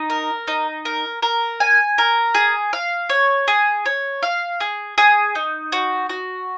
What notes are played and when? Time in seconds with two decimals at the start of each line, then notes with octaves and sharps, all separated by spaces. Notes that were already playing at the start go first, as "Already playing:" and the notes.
Already playing: D#4
0.10 A#4
0.48 D#4
0.85 A#4
1.22 A#4
1.60 G#5
1.98 A#4
2.35 G#4
2.73 F5
3.10 C#5
3.48 G#4
3.86 C#5
4.23 F5
4.60 G#4
4.98 G#4
5.35 D#4
5.72 F#4
6.09 F#4